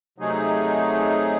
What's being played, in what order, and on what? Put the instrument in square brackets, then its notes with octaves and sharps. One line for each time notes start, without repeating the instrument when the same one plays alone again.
[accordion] C3 F#3 A3 D#4 G#4